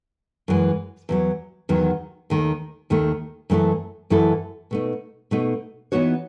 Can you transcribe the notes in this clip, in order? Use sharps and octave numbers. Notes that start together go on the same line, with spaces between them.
F#2 E3 G#3
E2 D#3 F#3
E2 D#3 F#3
D#2 D#3 A3
D#2 D#3 A3
F#2 E3 A3 E4 A4
F#2 E3 A3 E4 A4
B2 A3 D#4
B2 A3 D#4
E3 B3 D#4 F#4 C#5